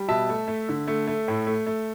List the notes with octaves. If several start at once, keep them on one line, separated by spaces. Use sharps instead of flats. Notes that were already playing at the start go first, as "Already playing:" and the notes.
Already playing: G3
B2 E5 A5
A3
A3
D3
A3
A3
A2
A3
A3